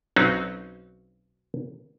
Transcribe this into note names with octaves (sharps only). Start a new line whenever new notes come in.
B1 F#3 C4 C#4 D#4 F#4